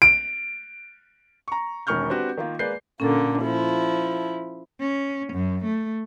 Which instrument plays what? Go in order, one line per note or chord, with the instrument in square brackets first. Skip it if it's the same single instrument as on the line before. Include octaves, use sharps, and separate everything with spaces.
[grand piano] D7
[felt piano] A#5 C#6
E1 D#3 C#4 C#6 F6 G6
C4 D4 F#4 G4 B4
D#3 A#3 F4
G#3 A#3 B4 D5 G6 C7
[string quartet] A#2 D3 A#3 [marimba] C#4 A4 A6
[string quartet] F3 E4
[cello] C#4
F#2
A3